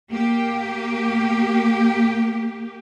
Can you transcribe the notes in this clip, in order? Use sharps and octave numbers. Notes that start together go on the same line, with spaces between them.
A#3 G4